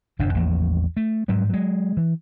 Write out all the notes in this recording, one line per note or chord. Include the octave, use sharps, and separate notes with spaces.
G1 F2 C3 D4
A1 E2 F3 A#3
A3
G#2 F#3 G3
F#3 G#3
E3